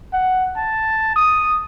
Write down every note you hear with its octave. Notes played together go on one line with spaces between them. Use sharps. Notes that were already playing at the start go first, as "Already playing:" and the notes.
F#5
A5
D#6